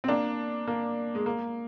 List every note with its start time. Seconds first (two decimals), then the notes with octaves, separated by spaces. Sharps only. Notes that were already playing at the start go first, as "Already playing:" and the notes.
0.04 C4
0.08 A#3 D4
0.67 A#3
1.15 G#3
1.26 A#3